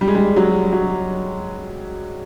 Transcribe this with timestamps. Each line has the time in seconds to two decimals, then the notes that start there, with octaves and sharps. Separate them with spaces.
0.01 G3
0.08 G#3
0.15 G3
0.36 F#3
0.72 F#3